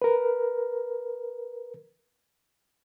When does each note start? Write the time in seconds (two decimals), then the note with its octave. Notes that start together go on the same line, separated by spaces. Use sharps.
0.02 A#4 B4